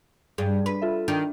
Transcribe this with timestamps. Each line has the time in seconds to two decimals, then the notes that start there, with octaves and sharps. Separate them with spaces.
0.38 G2 G#4
0.66 B4
0.82 F4 A4 E5
1.08 D#3 D4